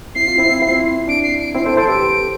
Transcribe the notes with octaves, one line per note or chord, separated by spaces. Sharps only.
C4 E4 C7
F4
C4 E4
C4 E4
D4 D7
C7
D7
C4 E4 C7
A4 C5 D7
A4 C5 D7
G4 B4 D7